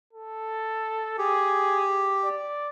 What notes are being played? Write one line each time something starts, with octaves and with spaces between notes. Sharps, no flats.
A4
G4 G#4
D5